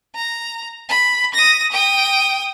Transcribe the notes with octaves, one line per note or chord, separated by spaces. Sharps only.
A#5
B5
D#6 A#6
G5 D#6